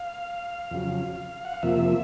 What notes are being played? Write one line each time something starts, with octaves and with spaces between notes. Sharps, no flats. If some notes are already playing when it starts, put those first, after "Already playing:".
Already playing: F5
F2 C#3 F#3
F#5
F5
F2 C3 F3 A#3 E5